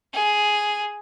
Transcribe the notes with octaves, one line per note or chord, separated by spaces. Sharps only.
G#4